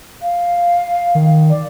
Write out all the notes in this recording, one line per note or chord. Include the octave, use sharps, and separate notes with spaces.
F5
D#3
D5